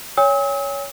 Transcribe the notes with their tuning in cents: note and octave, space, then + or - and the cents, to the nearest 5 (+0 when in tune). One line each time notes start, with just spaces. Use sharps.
C#5 +15 G#5 -40 E6 -45